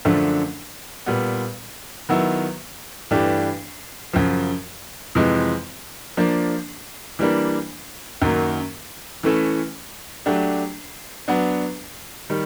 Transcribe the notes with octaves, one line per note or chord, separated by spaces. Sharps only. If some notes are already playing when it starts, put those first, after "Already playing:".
F#2 D3 F3 A3 D4
A#2 G3 B3
D#3 F#3 B3 E4
G2 E3 A3 D4 G4
F#2 C#3 F3
F2 C3 E3 G#3
F3 A#3 D4
E3 G3 A#3 D4
F#2 D#3 F#3 A#3
E3 A3 C#4 E4 A4
F#3 A3 D4 G4
F#3 B3 D4
D#3 G3